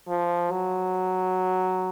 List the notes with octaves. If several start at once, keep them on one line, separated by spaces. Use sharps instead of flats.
F3
F#3